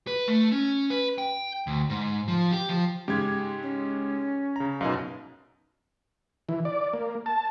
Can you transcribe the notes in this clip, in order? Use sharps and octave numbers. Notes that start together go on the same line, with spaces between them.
B4
A3
C#4
B4
G5
D2
G#2
F3
G4
F3
G#2 C#3 G#3 G4 G#6
C#4
C#3 A#5
F#2 B2 D#4 D#5 F5
E3
D5
A#3
A5